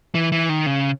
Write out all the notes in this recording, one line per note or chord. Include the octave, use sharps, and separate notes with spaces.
E3
E3
D#3
C#3